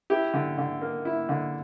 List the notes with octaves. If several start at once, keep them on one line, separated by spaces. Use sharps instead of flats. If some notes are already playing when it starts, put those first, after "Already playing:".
E4 G4
D3
D3
A#3
E4
D3